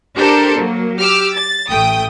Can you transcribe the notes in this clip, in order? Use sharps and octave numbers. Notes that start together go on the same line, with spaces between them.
D4 G4 A4 A#4 C5
F#3 A#3
G4 D6 E6 F6
A6
A1 A3 G5 D#6